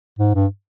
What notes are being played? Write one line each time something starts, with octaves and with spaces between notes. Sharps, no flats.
G#2
G2